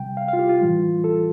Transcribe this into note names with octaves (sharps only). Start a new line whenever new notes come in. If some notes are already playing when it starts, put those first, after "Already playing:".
Already playing: C3 G3 G5
F5
F5
F4
G4
F4
A2 E3 G3
A4